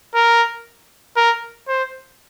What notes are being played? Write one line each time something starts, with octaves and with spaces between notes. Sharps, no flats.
A#4
A#4
C5